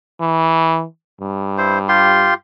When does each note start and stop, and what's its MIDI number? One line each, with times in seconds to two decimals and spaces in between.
0.20 0.85 52
1.21 2.32 43
1.58 1.78 64
1.58 1.78 72
1.89 2.34 65
1.89 2.34 67
1.89 2.34 84